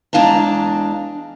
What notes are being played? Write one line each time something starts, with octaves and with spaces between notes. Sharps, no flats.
E2 G#3 D4 F5 A5 A#5